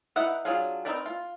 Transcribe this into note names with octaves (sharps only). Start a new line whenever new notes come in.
D#4 E4 B4 F#5
F#3 D4 F4 G#4 F5
C4 D#4 A#4 B4 D5
F4